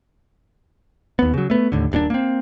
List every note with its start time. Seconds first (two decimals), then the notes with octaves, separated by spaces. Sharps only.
1.19 D#2 B3
1.34 C#3 F#3
1.50 A3 B3
1.72 D#2 A2 D3
1.92 D#1 G2 A#2 D4
2.10 A#3 C4